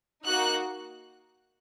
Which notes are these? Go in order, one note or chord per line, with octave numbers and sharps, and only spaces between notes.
A#3 D#4 F#4 F#6